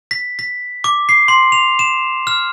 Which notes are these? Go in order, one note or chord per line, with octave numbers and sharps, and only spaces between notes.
B6
B6
D6
C7
C6
F7
E7
F6